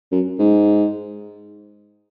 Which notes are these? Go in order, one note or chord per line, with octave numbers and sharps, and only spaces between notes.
F#2
G#2